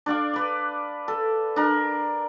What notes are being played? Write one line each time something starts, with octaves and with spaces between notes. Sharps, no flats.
D4 D5 F5 D6
B4 D5
A4
D4 A#4